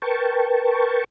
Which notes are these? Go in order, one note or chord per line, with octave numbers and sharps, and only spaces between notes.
A#4 B4 G5 A5 C#6